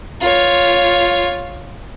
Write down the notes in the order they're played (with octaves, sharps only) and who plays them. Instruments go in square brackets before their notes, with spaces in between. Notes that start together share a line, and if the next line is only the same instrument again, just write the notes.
[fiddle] F4 C#5